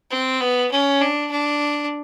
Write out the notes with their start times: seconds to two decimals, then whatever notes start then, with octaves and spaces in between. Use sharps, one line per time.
0.11 C4
0.41 B3
0.71 C#4
1.01 D4
1.31 D4